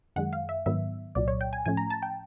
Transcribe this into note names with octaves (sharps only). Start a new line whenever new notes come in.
F#2 D#3 G#3 F#5
F5
E5
G#2 D#3 F#3 B3 E5
C2 A#2 F#3 D5
C#5
G5
G#5
A2 F3 A3 C#4 G#5
A#5
A5
G5